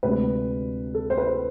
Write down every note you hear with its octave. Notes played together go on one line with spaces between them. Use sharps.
D2 C3 G#3 D4 B4
A4
C5
B4